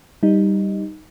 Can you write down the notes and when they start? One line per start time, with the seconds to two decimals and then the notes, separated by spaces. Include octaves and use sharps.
0.23 G3 D#4